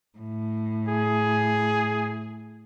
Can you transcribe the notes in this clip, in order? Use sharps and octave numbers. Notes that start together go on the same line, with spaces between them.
A2
G#4